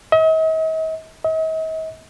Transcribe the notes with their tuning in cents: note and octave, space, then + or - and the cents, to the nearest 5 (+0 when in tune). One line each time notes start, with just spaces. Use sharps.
D#5 +45
D#5 +45